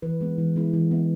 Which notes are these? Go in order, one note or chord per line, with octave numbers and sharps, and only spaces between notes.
E3 B4
G#3 B3 E4
E3
G#3 B3 E4
E3
B3 E4